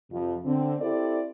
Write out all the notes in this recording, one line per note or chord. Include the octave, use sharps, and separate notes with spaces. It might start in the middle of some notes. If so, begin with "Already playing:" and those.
F2 C3 F3
D3 C4
C4 E4 G4 A4 C5 D5